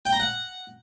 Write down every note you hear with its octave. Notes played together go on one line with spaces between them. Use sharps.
G5
A#5
F#5